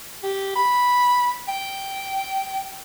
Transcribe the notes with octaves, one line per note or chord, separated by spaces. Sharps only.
G4
B5
G5